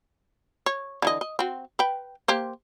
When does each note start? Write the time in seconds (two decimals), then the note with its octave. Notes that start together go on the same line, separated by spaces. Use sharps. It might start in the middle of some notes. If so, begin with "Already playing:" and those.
0.66 C#5
1.02 D3 E3 D#5
1.21 D#5
1.39 C4 F#4
1.79 B4 G5
2.28 A#3 G4 C5